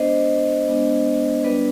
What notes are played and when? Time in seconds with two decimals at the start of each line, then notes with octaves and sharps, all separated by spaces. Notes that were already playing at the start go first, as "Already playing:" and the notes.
Already playing: G#3 B3 D4 C5 D#5
0.66 G#3 B3 D4
1.44 G3 B3 D4 B4 D5